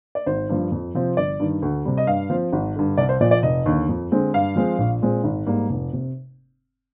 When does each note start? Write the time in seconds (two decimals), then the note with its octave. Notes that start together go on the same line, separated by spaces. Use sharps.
0.15 D5
0.26 G#1 C5
0.49 G2 F3
0.72 F2
0.95 C3 F3 C4
1.17 G1 D5
1.40 G2 D#3
1.62 D2
1.85 C3 G3
1.97 D#5
2.07 G2 F5
2.30 F3 C4
2.53 G#1
2.76 G2 D3
2.97 C2 D5
3.09 C5
3.21 A#2 F3 D5
3.31 D5
3.43 F1 D#5
3.66 D#2 D3
3.89 F2
4.12 D3 G#3 C4
4.34 G2 F5
4.56 F3 G#3 C4
4.78 A#1
5.02 A#2 G#3 C4
5.24 G#1
5.47 G#2 G3 A#3
5.69 F1
5.93 C3